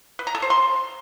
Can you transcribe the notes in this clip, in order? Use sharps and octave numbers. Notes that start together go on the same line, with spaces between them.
B4
A#5
A4
C5
C6